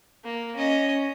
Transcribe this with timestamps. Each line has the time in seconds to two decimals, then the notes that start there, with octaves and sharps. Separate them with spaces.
0.25 A#3
0.56 C#4 D#5